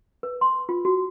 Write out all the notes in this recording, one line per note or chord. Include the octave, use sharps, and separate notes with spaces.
B4
C6
F4
F#4